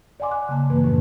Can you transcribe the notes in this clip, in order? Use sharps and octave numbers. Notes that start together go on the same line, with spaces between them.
D5 D#5 F#5 G#5 C6 D6
F#6
C#3 A#3 A5
G2 E3 A#3 B4
F#2 A2 F3 D4